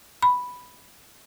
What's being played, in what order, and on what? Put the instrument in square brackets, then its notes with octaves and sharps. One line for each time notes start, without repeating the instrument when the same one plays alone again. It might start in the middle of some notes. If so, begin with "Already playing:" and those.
[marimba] B5